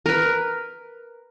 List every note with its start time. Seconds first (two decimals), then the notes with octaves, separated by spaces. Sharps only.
0.06 A#4 B4